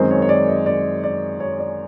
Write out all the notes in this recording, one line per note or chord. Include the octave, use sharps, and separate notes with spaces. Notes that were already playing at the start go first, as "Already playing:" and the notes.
Already playing: F#2 D#3 G#3 C4 C5
C#5
C#5
D5
D#5
D5
D5
C#5
D5